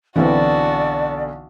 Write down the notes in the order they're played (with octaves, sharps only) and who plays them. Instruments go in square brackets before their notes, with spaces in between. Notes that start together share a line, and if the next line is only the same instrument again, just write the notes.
[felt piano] B1 D3 [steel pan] E3 C4 [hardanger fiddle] F#4 A5 [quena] D5